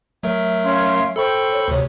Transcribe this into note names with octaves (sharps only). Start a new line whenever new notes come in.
F#3 A3 A#4 E5
C#4 F5 C6
A4 C5 G5 B5 C#6
C#5
D2 C3 C#5